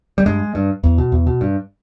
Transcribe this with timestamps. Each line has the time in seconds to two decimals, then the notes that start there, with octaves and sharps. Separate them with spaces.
0.18 G3
0.26 G2 G#3
0.55 G2
0.84 E2
0.98 B2
1.12 E2
1.27 B2
1.41 G2